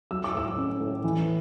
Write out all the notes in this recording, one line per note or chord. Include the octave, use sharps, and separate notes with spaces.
F#3 E6
D6
A2 E6
C#4
A2
E3